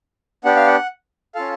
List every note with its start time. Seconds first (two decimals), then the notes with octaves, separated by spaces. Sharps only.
0.44 B3 D4 G4 F#5
0.56 F5
0.67 F#5
1.35 C#4 F4 A4 F5